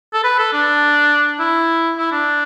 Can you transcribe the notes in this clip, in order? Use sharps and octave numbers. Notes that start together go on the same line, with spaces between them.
A4
B4
A4
D4
E4
E4
D4